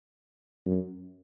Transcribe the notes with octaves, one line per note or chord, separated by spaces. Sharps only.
F#2